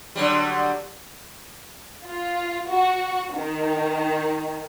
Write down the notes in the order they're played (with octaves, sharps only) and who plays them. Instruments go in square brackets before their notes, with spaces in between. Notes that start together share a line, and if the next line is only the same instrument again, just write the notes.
[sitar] D3 F#3 G3
[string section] F4
F#4
D#3